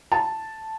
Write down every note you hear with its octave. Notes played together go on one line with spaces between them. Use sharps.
A5